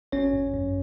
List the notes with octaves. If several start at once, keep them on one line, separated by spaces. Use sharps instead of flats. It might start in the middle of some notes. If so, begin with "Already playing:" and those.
G#1 C#4 C#5
F#2
F#2